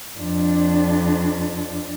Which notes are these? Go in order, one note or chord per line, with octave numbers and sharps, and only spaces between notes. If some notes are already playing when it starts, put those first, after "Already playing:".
F2 D4